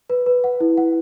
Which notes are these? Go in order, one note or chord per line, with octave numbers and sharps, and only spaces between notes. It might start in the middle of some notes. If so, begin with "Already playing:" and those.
B4
B4
F#5
E4
F#5